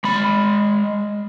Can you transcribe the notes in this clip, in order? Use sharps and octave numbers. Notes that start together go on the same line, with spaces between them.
G#3 B5